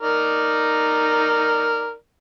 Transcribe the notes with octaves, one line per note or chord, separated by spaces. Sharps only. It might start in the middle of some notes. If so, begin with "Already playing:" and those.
D#4 A#4 D5